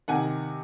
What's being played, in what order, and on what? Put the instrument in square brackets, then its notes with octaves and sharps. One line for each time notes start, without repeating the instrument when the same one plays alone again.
[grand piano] C3 D#3 F#5 G#5